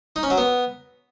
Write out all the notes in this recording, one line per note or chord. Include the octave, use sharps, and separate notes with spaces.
D#4
C#4
F#3
B3